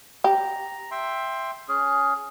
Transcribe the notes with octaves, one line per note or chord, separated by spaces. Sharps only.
G4 A#5
E5 G5 C6
C#4 G#4